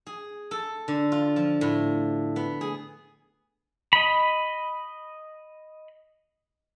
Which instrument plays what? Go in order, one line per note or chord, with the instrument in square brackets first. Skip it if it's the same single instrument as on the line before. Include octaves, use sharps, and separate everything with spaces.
[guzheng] G#4
A4
D3
F4
F3
A2
B3
G#4
[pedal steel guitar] D#5 B5